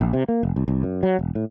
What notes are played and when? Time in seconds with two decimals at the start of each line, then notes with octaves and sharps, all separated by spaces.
0.01 A#1
0.13 C3
0.28 A#3
0.43 F1
0.56 C2
0.68 C2
0.83 F#2
1.03 F#3
1.19 E1
1.35 A2